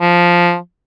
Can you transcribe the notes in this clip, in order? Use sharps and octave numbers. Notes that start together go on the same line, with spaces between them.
F3